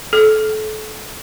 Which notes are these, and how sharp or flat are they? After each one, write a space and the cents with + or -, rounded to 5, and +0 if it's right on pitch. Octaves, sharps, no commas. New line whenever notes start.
A4 -30